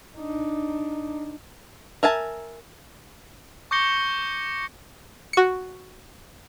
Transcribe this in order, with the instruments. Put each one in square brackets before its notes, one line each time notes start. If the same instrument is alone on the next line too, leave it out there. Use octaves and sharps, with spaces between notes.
[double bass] D4 D#4
[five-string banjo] A#4 E5 G#5 A5
[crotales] C#6 D6 G6 A#6 C#7 G7
[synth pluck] F#4 C#7